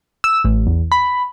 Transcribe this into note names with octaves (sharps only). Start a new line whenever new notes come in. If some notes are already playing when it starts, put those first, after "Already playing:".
E6
A1
E2
B5